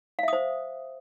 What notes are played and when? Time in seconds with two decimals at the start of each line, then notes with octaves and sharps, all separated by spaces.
0.19 F5
0.23 E5
0.28 D#6
0.33 C5